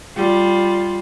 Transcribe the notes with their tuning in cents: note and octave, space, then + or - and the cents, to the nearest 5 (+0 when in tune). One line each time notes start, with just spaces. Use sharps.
G3 +0 F4 +0